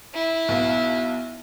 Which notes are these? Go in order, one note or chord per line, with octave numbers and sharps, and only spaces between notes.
E4
B1 B3 F5